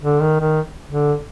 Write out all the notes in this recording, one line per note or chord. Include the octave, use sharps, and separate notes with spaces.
D3
D#3
D#3
D3